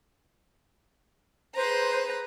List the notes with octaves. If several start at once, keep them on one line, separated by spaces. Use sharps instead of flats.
G#4 B4 C5 A#5